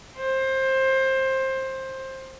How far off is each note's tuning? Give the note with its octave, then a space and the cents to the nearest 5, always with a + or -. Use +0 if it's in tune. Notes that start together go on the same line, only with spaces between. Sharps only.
C5 +20